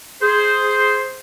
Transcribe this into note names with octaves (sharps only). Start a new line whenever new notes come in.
G#4 C5